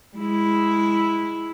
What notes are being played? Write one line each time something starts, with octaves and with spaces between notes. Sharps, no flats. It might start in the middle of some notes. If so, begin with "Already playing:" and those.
G#3 E4